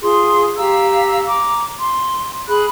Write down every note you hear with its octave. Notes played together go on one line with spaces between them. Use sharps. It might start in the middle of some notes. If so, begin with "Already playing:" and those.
F4 G#4 C6
G4 F5 A#5 E6
A#5 D6
C6
G#4 B5 F#6